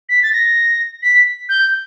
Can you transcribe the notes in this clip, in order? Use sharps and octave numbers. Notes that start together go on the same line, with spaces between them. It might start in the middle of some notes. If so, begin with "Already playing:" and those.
B6
A6
A#6
B6
G6